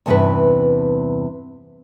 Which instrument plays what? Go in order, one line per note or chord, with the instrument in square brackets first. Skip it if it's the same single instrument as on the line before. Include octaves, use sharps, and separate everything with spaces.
[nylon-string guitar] E2 G2 C3 E3 C#4 B4